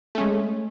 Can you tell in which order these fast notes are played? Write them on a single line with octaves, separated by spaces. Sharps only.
A3 C#4 G#3